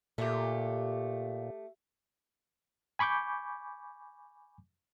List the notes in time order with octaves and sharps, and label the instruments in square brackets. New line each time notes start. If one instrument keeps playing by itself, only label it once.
[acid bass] A#2 [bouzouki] A3 G4
[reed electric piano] G#5 B5 C#6 D6 G6